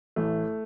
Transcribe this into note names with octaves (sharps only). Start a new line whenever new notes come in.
A1 A3